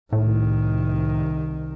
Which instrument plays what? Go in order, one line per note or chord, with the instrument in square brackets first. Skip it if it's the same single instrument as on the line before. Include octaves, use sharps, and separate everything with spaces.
[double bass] C2 D#3 [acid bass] A2